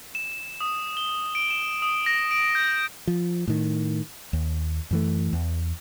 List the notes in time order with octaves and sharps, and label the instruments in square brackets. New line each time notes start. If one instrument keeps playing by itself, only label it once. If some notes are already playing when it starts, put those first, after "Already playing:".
[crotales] E7
D#6
G7
D7
E7
D#6
A#6
D7
G6
[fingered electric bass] F3
A2 D#3
D#2
F#2 E3 A3
E2